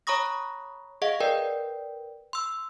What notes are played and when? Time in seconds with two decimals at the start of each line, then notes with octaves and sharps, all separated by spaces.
0.07 C#5 A#5 B5 C#6 D#6 A#6
1.02 G#4 D#5 F5 F#5
1.20 A#4 B4 D5 G5
2.33 C6 E6